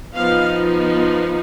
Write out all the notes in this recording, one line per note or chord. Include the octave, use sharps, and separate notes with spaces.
F3 B3 D#4 F5